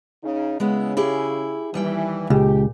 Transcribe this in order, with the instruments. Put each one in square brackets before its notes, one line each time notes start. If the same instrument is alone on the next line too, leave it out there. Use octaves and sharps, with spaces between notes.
[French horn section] C#3 D#4
[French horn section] C#3 [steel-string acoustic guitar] G#3 B3 E4
[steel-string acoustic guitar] E4 G4 G#4
[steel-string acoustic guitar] D#2 G3 G5 [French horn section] E3
[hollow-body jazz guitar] C#2 [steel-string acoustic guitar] A#2 [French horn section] G4